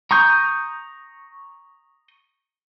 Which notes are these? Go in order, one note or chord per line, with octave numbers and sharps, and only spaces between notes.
A#5 C#6 D#6 G6